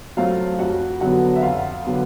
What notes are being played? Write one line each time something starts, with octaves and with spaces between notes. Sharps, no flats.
F#3 A3 C4 F4 F5
F2 F#4 F#5
D3 F#3 B3 F#4 F#5
E5
F2 F4 F5
D3 F#3 B3